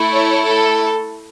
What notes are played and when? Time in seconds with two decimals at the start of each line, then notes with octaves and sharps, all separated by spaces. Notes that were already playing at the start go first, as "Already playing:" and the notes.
Already playing: A3 E4 A4
0.13 C#5
0.45 A4